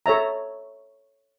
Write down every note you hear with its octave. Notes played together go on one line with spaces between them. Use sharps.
A4 C#5 E5 A#5